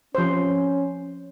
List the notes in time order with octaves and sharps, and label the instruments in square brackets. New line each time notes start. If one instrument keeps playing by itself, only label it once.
[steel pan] F3 C5 [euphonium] C#4